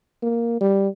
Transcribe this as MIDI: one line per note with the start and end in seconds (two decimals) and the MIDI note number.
0.22 0.57 58
0.61 0.88 55